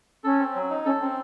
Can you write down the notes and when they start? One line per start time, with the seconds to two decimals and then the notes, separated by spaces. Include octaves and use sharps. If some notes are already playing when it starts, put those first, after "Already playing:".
0.24 C#4 A4
0.39 C4
0.55 F#3
0.70 D#4
0.85 C#4 A4
1.01 C4 C#4